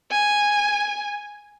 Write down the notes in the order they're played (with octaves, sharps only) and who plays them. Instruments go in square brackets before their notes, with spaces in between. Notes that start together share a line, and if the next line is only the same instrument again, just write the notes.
[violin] G#5